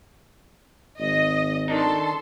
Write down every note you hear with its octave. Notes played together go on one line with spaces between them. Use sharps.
G#1 D#5
D#3 D4 D#4 A4 C6